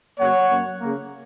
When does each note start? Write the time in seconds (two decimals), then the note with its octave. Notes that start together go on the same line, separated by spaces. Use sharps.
0.18 C#3 F#3 A#3 C#5 F#5
0.49 F#2 F#3 A#3
0.80 C#3 A#3